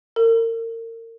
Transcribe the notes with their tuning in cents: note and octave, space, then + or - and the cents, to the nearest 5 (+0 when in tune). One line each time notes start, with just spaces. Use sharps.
A#4 -35